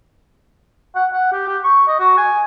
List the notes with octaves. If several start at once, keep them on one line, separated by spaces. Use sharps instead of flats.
F#5
F#5
G4
G4
C#6
D#5
F#4
G#5